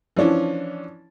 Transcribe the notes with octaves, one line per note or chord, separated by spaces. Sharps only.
E3 F3 C#4 D4